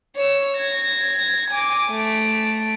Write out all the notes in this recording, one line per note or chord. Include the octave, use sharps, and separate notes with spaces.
C#5 E6
G#6 A#6
G#5 D6
A3 D7